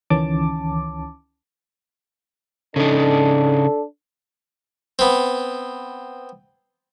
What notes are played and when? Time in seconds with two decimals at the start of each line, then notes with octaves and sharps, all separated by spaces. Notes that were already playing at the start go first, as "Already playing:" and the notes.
0.10 C#2 D#3 E3 C#4 A5 D6
2.76 C#3 D4 D#4 A4
4.99 B3 C4